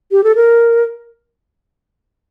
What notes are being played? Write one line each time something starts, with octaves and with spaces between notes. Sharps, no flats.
G4
A4
A#4